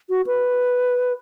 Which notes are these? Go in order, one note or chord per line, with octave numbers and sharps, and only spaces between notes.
F#4
B4